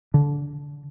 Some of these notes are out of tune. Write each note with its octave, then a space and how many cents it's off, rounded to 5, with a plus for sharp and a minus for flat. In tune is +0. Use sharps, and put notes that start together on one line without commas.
D3 -20